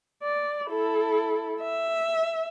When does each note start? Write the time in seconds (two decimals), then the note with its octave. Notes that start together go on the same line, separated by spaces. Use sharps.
0.23 D5
0.69 E4 A4
1.62 E5